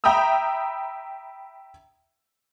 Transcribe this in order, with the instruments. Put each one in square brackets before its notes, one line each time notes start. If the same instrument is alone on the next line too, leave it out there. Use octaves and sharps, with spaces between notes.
[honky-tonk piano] E5 G5 A#5 B5 D#6 E6